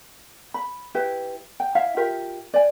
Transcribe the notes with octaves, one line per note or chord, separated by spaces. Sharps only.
B5
E4 G4 B4
G5
E4 E5 F5
F4 G4 A#4 E5
D5 G#5